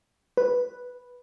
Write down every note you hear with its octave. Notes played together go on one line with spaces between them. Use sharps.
B4